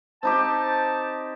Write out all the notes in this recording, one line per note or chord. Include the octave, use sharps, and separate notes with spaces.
C4 D#4 G4 A5